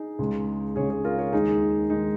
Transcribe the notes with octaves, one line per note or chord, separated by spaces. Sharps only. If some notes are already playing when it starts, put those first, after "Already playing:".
Already playing: D#4 G#4
C#2 C#3 G#3
C#2 C#3 G#3 G#4 C#5
G#4 C#5
F4 A#4
G#4 C#5
D#2 D#3 G#3 D#4 G#4
D#3 G#3 D#4